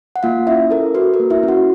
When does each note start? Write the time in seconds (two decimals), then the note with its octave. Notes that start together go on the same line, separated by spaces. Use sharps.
0.16 F#5
0.23 A#3 F4 F5
0.47 C#4 E4 E5
0.71 A4 A#4
0.94 F#4 B4
1.14 A#4
1.20 A#3
1.30 E4 E5
1.43 C#4
1.48 F#4 F#5